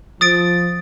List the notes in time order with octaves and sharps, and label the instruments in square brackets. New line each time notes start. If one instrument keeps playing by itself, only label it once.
[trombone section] F3 [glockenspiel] D#6 A6 D7